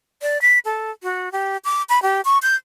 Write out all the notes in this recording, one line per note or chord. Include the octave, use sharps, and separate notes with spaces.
D5
B6
A4
F#4
G4
D6
B5
G4
C#6
G6